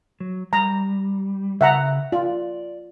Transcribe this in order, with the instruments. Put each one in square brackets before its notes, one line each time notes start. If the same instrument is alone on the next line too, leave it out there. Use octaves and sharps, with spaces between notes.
[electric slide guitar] F#3
[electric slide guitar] G3 [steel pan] A#5
[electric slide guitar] C#3 [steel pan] E5 F#5 A#5
[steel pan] F4 [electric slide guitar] D5